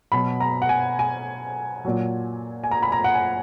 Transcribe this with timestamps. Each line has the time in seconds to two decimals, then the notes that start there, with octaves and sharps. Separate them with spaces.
0.12 B2 F#3 B5
0.40 A#5
0.62 F#5
0.69 G#5
0.99 G#5
1.85 A#2 F#3
2.64 G#5
2.71 A#5
2.82 B5
2.92 A#5
3.04 F#5
3.14 G#5